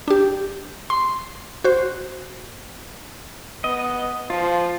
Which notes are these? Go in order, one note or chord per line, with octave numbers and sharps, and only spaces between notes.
D4 G4
C6
F#4 C5
B3 D#5
F3 F4